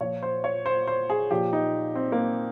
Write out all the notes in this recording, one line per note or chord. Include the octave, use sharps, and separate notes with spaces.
A#2 F3 C#5
C5
C#5
C5
C5
G#4
A#2 F3 G4
D#4
C4
A#3